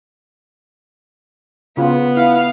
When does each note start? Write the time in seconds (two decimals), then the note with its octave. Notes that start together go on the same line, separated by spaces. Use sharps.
1.77 C#3 B3 F4
2.17 E4 F5